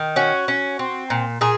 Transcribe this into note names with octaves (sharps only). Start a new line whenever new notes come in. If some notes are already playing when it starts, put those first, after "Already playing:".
Already playing: D#3
C#4 F#4
C#4
C4
A#2
A#2 G#4